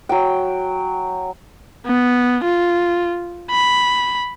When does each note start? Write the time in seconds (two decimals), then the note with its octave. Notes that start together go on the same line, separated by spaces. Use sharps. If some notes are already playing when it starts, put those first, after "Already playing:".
0.09 F#3 G5
1.86 B3
2.44 F4
3.51 B5